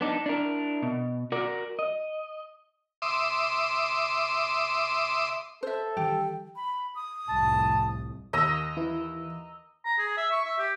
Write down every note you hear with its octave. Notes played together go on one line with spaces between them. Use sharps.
B3 D4 D#4
D4 E4 A#4
B2
F#4 A#4 D5
D#5
E5 C6 D6 D#6
A4 C5 E5
D#3 E3 G3 G4 G5
B5
D#6
C2 F2 A2 A5
D#2 D#5 A#5 E6
E3 E4
A#5
G#4
E5
C#6
E5
G4